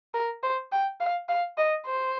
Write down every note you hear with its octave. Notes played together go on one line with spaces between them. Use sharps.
A#4
C5
G5
F5
F5
D#5
C5